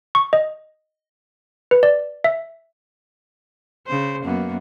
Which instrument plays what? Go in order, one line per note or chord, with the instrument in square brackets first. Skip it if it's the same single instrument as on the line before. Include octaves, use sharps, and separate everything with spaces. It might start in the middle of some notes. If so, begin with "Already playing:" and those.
[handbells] C#6
D#5
B4
D5
E5
[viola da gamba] C#3 C5
F#2 A#3 B3